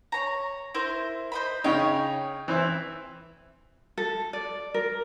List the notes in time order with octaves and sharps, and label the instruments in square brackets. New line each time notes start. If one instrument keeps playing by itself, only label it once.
[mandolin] C#5 A#5
E4 A#4 C5
C5 D#5 B5
[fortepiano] C#3 D#4 [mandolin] C#5 G5
[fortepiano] E3 C4 E4
[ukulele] A4
D5
A#4